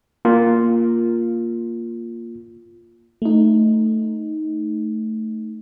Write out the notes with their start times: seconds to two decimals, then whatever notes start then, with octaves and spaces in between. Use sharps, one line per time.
0.25 A#3 F4
3.22 A3 D#4